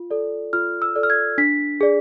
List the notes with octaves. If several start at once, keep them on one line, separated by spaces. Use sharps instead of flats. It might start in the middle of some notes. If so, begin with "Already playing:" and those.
Already playing: F4
A4 D5
F4 F6
E6
A4 D5
F6
G#6
D4 B6
G#4 D5